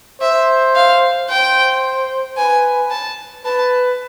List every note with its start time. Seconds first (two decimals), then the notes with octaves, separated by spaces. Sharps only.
0.21 C5 E5
0.76 F5
1.29 C5 G5
2.37 B4 G#5
2.90 A5
3.45 B4 A5